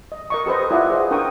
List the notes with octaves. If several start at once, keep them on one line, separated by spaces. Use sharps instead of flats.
D#5
A#4 D#5 C#6
G4 A4 B4 C5 D#5
E4 F4 D5 F5 F#5
G#4 C5 D#5
D4 A#4 G5 C#6 D#6